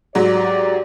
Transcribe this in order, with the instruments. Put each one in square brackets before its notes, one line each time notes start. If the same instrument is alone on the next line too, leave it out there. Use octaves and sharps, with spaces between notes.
[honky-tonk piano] G#2 F#3 [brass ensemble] G4 D5